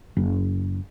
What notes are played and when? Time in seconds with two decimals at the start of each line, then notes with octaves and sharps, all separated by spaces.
0.17 F#1